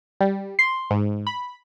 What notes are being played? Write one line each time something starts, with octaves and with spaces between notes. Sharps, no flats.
G3
C6
G#2
B5